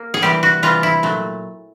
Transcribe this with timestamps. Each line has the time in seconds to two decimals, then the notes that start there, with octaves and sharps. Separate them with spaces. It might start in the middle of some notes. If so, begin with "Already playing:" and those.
Already playing: A#3
0.14 G#4
0.22 C3 E3 G3 G4
0.43 F#4
0.63 C3 E3 G3 F4
0.83 E4
1.03 A#2 F#3 A3